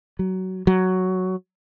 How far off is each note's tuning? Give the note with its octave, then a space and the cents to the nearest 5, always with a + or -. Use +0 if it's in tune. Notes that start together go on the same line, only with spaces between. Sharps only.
F#3 +15
F#3 +5